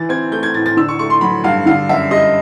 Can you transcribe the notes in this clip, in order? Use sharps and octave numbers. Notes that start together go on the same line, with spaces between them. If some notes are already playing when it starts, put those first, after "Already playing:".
Already playing: E3 A6
C4 G#6
A3 G6
G#6
A2 A6
A6
D3 E6
C#6
A3 C#6
C6
F#3 B5
G2 F5
D3 F5
F#2 E5
G3 D#5